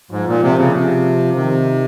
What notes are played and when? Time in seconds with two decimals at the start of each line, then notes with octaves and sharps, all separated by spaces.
0.11 G#2 F3
0.27 A#2
0.42 C3
0.58 C#3
0.73 C3
1.36 C3 D#3